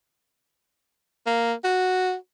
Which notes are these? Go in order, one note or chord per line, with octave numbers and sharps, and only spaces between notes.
A#3
F#4